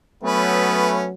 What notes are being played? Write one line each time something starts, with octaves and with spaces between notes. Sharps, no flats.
F#3 A3 B3 C#4 B4